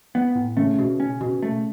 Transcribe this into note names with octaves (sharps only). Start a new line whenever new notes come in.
B3
A2
C#3 A3
B2
C#4
B2
A3